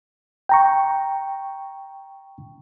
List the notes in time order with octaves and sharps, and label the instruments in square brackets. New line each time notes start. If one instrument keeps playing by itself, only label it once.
[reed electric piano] G5 A#5 C#6